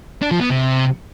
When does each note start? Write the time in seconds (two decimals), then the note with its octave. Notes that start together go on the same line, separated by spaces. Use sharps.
0.22 D4
0.31 F3
0.41 B3
0.50 C3